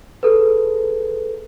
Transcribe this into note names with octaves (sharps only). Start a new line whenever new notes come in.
G#4 A4 B4